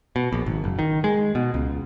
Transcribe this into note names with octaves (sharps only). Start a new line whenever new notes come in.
B2
A#1
G#1
F#1
D#3
G#3
B2
C#2